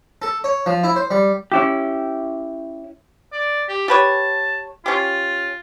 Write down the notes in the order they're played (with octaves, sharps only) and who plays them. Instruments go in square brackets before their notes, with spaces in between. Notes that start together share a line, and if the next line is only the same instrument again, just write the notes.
[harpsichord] A4
C#5
F3
E4
C5
G3
[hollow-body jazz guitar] C#4 E4 G4
[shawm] D5
G4
[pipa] G4 B4 C#5 [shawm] A5
[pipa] C#4 G4 [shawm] F4